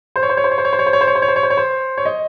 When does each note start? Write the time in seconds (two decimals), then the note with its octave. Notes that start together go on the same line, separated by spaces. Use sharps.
0.16 C5
0.23 C#5
0.29 C5
0.37 C#5
0.44 C5
0.51 C#5
0.58 C5
0.65 C#5
0.73 C5
0.79 C#5
0.86 C5
0.93 C#5
1.01 C5
1.07 C#5
1.15 C5
1.22 C#5
1.28 C5
1.36 C#5
1.43 C5
1.50 C#5
1.57 C5
1.98 C#5
2.05 D#5